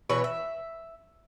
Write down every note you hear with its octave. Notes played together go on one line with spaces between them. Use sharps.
B2 E3 B4 C#5
E5